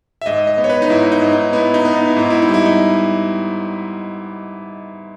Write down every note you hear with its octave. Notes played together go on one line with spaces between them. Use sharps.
E5
G#2 D#5
D#5
B3
C#5
B4
D#4
G#2 E4
D#4
G#2
D#4
B3 E4
D#4
B3
D#4
E4
G#2 D#4
E4
D#4
G3 E4
D#4